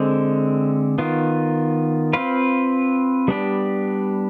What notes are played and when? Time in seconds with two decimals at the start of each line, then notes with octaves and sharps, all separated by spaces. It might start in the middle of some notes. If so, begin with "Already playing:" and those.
Already playing: D3 G#3 C4
0.98 D#3 B3 F4
2.13 C4 F4 B4 F5
3.28 G3 B3 D4 G4